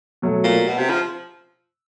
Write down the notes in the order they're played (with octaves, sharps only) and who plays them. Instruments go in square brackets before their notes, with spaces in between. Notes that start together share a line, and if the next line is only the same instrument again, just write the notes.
[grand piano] B2 F#3 A3
[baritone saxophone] A#2
B2
C3
F3